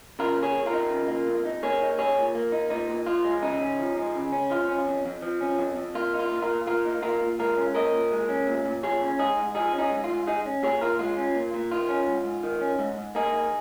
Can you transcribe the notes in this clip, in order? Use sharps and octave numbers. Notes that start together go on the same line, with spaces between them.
C#3 F4 A#4
A#3
G#4 C#5
F2
F4 A#4
D#4
C#3
A#3
F2
D#4
A#3 G#4 C#5
D#4
A#2 G#4 C#5
A#2
A#3
D#4
A#2 D#4
A#2
F3 F4
G#3
C#3 D#4
C#4
F3
G#3
C#3
C#4
F3 F4
C#4
F2
F2
F3
C#4
F2
F2
A#3 F4
D#4
F4
A#2
F4 A#4
A#2
A#3 F4 A#4
D#4
A#2 F4 A#4
A#2
G#3 F4 A#4
C#4
A#2 A#4 D#5
A#2
G#3
C#4
A#2
A#2
F3 G#4 C#5
C#4
G#2 D#4 G#4
G#2
F3 D#4 G#4
C#4
D#4 G#4
G#2
F4
G#2
G#3 D#4 G#4
C#4
A#2 G#4 C#5
A#2 F4 A#4
G#3 F4
C#4
A#2
A#2
D#3 F4
C#4
G#2
G#2
D#3
C#4
G#2
G#2
A#3 D#4 G#4
D#4